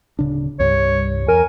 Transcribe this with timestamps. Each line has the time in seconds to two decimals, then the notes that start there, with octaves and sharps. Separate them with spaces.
0.19 D1 C#3 D4
0.59 C2 G2 G3 C#5
1.28 E2 A#4 G#5